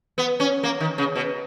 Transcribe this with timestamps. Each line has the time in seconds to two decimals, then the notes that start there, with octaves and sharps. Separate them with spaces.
0.18 B3
0.40 C#4
0.63 A#3
0.80 D#3
0.98 C#3
1.16 B2